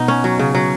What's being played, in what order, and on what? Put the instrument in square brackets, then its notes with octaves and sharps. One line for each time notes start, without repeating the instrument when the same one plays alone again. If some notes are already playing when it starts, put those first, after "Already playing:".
Already playing: [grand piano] B2 [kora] B3 D#4
[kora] C#4
F#3
C#3
F#3